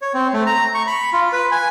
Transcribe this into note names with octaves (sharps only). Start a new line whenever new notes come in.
C#5
C4
A3
A#5
C#6
B5
F4
B4
G#5